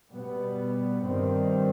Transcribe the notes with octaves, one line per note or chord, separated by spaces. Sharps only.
B2 G3 B3
G2 D#3 G3 C4